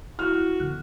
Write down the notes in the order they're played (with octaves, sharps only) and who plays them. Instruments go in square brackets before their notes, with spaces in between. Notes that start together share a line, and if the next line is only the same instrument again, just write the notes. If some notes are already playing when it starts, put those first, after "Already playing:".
[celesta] E4 F#6 [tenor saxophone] F#4 [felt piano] F6
[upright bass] D3 B3 [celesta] F#6